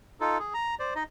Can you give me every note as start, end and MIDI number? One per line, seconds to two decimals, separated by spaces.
0.21 0.38 63
0.21 0.38 65
0.21 0.38 69
0.39 0.54 68
0.54 0.75 82
0.79 0.94 72
0.79 0.94 74
0.95 1.03 63
0.95 1.03 75